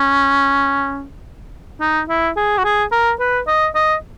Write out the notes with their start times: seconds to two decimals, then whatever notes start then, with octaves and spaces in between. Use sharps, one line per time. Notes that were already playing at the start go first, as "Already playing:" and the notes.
Already playing: C#4
1.81 D#4
2.09 E4
2.36 G#4
2.58 F#4
2.64 G#4
2.92 A#4
3.20 B4
3.47 D#5
3.75 D#5